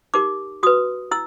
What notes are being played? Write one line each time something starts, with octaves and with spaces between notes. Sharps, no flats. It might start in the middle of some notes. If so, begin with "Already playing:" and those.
D#4 G4 A#4 D6
F#4 B4 D#6
E4 E6